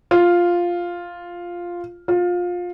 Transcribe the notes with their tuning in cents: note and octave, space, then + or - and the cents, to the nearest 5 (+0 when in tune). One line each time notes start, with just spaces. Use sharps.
F4 +0
F4 +20